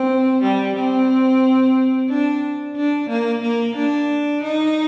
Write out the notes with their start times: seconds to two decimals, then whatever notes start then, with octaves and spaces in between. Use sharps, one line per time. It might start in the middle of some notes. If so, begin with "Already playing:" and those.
Already playing: C4
0.42 G3
0.76 C4
2.09 D4
2.76 D4
3.09 A#3
3.42 A#3
3.76 D4
4.43 D#4